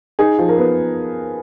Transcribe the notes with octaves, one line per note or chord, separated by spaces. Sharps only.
D#4 G#4
F3
A#4
B3